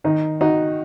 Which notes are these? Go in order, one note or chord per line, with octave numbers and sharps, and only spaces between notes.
D#3 D#4
D#4 F#4